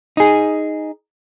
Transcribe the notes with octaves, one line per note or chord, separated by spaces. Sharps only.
D#4 G#4